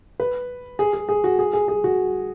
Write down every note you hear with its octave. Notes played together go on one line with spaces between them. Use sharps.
B4
G#4
G#4
G#4
F#4
G#4
G#4
G#4
F#4